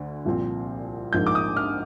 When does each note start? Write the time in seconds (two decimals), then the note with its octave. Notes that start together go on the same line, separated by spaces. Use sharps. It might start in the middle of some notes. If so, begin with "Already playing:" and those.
Already playing: D2 D3
0.25 C2 A#2 F3 C4
1.13 A#1 G#2 F3 A#3 G6
1.27 D6
1.35 D#6
1.56 F6